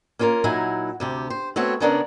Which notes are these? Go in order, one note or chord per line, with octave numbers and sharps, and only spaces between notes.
A#3 C#4 F4 A4 A#4
A#2 F#3 D#4 E4 F#5 G#5
D2 C3 G4
C5
A3 B3 C4 F#4 C#5
C#3 B3 C#4 D4 A#4 D5